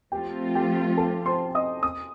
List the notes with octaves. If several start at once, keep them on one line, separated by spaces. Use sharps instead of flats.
F3 A3 C4 F4 G4 G5
G4 G5
A4 A5
C5 C6
D#5 D#6
D#6